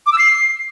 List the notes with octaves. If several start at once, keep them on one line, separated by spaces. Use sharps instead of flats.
D6
E6
C7